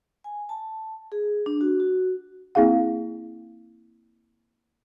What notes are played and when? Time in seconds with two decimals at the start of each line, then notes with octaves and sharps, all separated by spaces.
0.24 G#5
0.49 A5
1.12 G#4
1.46 D4
1.61 F#4
1.80 F#4
2.55 A#3 C4 E4 G#4 F5 F#5